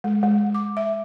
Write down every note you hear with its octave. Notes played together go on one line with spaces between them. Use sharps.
G#3
G#3
D6
E5